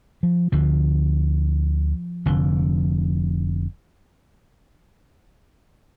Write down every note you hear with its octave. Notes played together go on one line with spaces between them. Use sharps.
F3
D2 D3 F3
F1 F2 D3